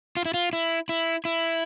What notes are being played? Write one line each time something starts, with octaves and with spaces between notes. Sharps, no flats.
F4
E4
F4
E4
E4
E4